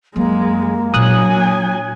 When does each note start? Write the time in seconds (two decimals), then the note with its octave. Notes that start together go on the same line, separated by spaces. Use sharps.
0.16 F#2 G#3 A#3
0.94 A#2 F#3 D4 G#5 D#6 F#6